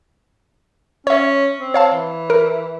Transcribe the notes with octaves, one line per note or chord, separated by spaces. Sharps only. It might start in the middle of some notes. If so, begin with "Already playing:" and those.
C#4 C#5 E5
C4
C#5 F5 A5
E3
A#4